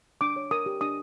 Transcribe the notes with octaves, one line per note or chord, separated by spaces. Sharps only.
D4 D6
C#5
A#4 D#6
G4
D4 D#6